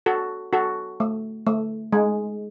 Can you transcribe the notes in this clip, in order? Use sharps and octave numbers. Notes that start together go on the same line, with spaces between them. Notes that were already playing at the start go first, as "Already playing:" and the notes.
F#4 A4
F#4 A4
A3
A3
G#3